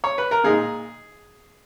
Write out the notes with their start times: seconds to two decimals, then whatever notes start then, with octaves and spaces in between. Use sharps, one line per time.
0.04 C#5
0.18 B4
0.31 A#4
0.44 A#2 G#3 D#4 G#4